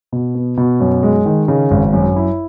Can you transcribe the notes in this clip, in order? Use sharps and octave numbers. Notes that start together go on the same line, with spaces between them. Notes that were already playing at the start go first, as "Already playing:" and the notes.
B2
B3
B2
F#2
G#3
D#3
C#3
G#1
F#2
E4